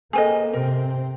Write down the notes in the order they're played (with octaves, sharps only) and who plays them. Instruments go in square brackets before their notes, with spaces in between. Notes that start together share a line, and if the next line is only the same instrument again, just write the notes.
[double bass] A#3 [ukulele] G#4 C5 D#5 [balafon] A4 G5 G#5
[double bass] C3 C4 [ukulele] A#4